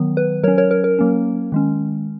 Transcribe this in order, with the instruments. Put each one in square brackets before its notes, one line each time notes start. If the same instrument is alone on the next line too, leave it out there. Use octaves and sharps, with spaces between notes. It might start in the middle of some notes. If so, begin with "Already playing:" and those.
Already playing: [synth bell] D#3 F#3 B3
B4
F#3 A#4 C#5
C#4
A#4 C#5
A#4
A#4
F#3 A#3 C#4
D#3 G#3 C#4